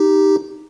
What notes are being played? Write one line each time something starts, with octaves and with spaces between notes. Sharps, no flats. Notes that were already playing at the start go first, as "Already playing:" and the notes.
Already playing: D#4 G4